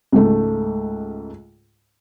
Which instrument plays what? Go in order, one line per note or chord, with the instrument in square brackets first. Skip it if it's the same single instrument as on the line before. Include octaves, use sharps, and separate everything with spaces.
[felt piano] C#2 G#2 A3